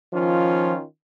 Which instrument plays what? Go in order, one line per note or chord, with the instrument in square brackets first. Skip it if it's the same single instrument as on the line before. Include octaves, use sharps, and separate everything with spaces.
[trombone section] D#3 C#4 F4 [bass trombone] F3